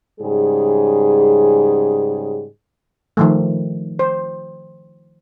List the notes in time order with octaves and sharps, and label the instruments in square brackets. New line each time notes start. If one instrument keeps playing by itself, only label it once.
[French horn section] G#2 C#3 G3 G#4
[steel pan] D#3 F3 A3
C5